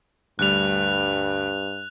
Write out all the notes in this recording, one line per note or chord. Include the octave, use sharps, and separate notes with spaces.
D2 G2 G3 F#6 F7